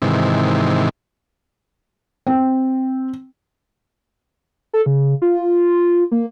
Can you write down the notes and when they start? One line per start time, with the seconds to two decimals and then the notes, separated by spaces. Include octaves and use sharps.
0.02 G#2 C3 D#3 E3
2.27 C4
4.73 A4
4.86 C#3
5.22 F4
6.11 A#3